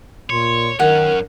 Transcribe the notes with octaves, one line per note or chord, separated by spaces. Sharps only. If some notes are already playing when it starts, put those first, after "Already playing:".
A#2 C#5 C6
F#2 D#3 C#4 A#4 F#5